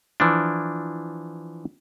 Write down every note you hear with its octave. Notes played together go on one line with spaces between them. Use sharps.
E3 F3 D4